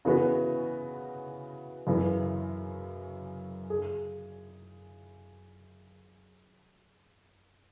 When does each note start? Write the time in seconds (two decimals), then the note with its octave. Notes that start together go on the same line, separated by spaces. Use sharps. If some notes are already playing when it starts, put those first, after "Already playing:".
0.05 C#3 E3 B3 F#4
1.87 F#2 C#3 E3
3.70 G#4